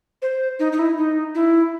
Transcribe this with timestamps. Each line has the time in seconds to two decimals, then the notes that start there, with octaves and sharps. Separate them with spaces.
0.22 C5
0.60 D#4
0.72 D#4
0.79 E4
0.97 D#4
1.35 E4